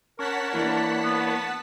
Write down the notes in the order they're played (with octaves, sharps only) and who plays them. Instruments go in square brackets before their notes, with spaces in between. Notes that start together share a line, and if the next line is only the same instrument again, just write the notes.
[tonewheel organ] C#4 C#5 [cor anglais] A#4 [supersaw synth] F#5 A5 B6
[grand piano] E3 D4 [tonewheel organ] A#3 C#5 B5
[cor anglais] B3